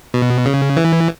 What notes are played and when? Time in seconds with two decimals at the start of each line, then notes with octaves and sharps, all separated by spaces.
0.14 B2
0.46 C#3
0.76 E3